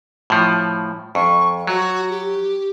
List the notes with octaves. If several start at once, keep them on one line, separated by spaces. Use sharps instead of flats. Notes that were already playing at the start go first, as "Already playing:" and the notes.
A2 F3
F2 C#6
F#3 F#4
G4